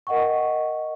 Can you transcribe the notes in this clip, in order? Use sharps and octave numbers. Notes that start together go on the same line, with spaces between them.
A#4 D#5 F#5 G5 C#6